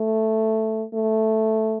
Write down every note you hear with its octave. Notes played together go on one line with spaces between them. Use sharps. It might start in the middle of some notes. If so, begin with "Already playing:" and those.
Already playing: A3
A3